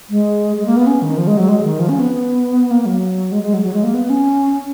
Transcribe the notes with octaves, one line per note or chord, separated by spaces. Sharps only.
G#3
G#3
A#3
B3
C#4
D#3
F3
G#3
F#3
G#3
D#3
F3
C#4
B3
A#3
F#3
G#3
G#3
F#3
F#3
G#3
A#3
B3
C#4